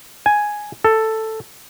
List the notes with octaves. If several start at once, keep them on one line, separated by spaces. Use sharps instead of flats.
G#5
A4